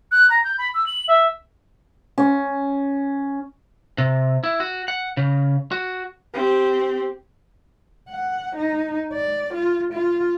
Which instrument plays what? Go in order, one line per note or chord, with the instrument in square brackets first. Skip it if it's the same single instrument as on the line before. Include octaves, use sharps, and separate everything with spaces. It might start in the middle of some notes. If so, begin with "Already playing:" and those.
[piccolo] F#6
A#5
G6
B5
E6
F#7
E5
[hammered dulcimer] C#4
[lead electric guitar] C3
E4
F#4
F#5
C#3
F#4
[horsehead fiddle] C4 G4
[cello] F#5
D#4
D5
F4
F4